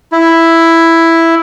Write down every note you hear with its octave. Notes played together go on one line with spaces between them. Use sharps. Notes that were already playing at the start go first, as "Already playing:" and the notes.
E4